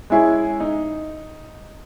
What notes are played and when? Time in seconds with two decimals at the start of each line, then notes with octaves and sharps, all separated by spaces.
0.10 G#3 C#4 E4 G#4
0.60 D#4